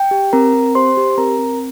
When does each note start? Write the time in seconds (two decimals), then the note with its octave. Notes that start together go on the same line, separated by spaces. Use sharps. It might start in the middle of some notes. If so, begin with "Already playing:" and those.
Already playing: G5
0.11 G4
0.33 C4 A#4 A#5
0.54 C4
0.75 G4 C5 C6
0.97 G4
1.18 C4 A#4 A#5
1.39 C4